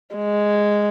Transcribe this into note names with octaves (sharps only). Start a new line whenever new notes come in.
G#3